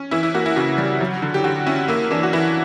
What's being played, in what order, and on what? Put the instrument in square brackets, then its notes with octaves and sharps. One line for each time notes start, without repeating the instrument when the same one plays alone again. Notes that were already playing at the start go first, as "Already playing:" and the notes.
Already playing: [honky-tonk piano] C#4
E3 E4
E4
A#3 F#4
E4
C#3 F#4
G3
F#3
D3
G4
D3 F#4
C#4 E4
A#3 E4
E3 D4
F#4
E3 E4